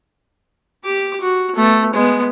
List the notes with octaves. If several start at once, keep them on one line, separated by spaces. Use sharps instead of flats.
G4 D6
F#4
A3 B3
G#3 B3